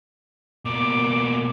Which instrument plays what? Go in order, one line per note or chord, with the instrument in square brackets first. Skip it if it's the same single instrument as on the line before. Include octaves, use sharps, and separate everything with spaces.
[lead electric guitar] B2 A#3 [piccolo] D6